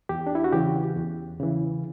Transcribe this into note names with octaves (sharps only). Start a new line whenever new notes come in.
E2 G4
D4
E4
F#4
C#3 E3 G4
E2
C#3 E3